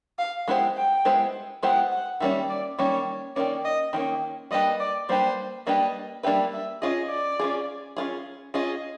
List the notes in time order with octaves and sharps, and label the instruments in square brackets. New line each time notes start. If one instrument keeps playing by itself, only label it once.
[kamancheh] F5
[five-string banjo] G#3 B3 E4 G4 C5 [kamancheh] F#5
[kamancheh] G5
[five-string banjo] G#3 B3 E4 G4 C5
[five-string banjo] G#3 B3 E4 G4 C5 [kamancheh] F#5
[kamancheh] F#5
[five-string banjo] D#3 G3 A#3 C#4 [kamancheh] E5
[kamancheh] D5
[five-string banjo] D#3 G3 A#3 C#4 [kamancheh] C#5
[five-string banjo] D#3 G3 A#3 C#4 [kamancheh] D5
[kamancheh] D#5
[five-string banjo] D#3 G3 A#3 C#4 [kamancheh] G5
[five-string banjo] G3 A#3 D4 G4 B4 [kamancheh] D#5
[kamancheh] D5
[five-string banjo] G3 A#3 D4 G4 B4 [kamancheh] C5
[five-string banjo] G3 A#3 D4 G4 B4 [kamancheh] D#5
[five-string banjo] G3 A#3 D4 G4 B4 [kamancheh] E5
[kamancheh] E5
[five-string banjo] C#4 F4 G#4 [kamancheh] D#5
[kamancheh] D5
[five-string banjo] C#4 F4 G#4
C#4 F4 G#4
[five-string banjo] C#4 F4 G#4 [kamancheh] D#5